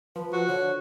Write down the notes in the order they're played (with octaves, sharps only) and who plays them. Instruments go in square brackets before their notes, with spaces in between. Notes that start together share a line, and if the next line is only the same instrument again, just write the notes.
[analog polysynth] F3 [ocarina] B4
[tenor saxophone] F#4
[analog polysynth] D3 [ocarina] C#5